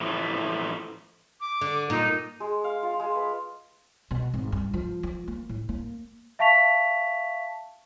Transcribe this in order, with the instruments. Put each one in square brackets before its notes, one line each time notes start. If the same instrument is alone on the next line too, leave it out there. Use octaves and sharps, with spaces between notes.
[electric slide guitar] A2 E3 F3 A3
[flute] D6
[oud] D3
[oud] A#2 [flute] D#4
[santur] G#3
F5
F4
G#3
B4
[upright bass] B2
G#1
G2
F3
F3
A#3
A2
A#3
[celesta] E5 F5 A5 C#6 B6 F7